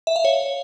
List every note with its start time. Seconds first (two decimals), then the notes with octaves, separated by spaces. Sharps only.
0.07 E5
0.16 F5
0.25 C#5